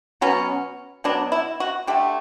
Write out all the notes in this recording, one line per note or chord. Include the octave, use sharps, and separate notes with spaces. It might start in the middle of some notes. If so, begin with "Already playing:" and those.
B2 F#3 B3 C#4
B2 F#3 B3 D4
E4
F#4
D3 A3 G4